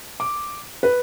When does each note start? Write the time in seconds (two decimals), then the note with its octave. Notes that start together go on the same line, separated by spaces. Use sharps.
0.20 D6
0.83 B4